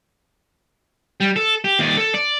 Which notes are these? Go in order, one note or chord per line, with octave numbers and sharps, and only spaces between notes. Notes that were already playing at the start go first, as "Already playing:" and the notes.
G3
A4
G4
D#2 D5
A4
D5